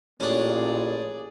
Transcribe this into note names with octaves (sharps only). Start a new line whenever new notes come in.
A1 A#2 E3 A#3 C#4 D4 G#4 D5